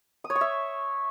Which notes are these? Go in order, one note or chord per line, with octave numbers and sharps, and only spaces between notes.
D#6
C#5
C#6
E5